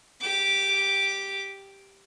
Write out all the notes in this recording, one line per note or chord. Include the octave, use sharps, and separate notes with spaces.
G4 D6